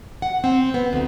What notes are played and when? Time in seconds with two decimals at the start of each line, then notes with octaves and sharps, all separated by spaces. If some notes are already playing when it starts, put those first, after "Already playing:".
0.22 F#5
0.44 C4
0.74 B3
0.93 D2